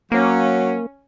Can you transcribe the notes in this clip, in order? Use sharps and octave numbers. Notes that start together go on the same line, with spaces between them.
F#3 A#3 C#4